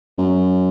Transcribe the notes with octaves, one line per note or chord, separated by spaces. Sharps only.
F#2